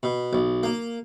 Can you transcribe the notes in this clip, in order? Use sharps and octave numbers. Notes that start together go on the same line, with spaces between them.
B2
B1
A#3